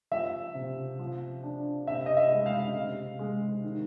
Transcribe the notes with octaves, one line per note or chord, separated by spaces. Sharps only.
F3 E5
C3
F3
D4
C3 E5
D#5
E5
G#3
F5
C3
G#3
D#3